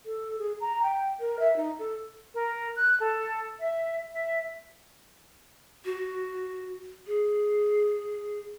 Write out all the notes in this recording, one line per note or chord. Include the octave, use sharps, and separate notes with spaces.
A4
G#4
A#5
G5
A#4
E5
D#4
A4
A#4
F#6
A4
E5
E5
F#4
G#4